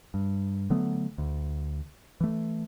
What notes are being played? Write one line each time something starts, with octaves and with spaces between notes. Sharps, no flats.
G2
D3 F#3 A3 B3
D2
E3 A3